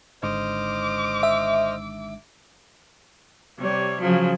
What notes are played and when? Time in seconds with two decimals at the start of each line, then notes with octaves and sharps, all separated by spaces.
0.23 G#1 G#2 D3 C5 D#5 D6 F6
1.23 E5
3.58 C3 G3 C#5
4.01 C#3 F3 F#3